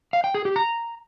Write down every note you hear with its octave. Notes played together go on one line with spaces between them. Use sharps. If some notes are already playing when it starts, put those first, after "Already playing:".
F5
G5
G#4
G4
A#5